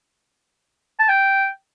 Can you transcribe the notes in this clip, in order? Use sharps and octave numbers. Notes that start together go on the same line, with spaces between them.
A5
G5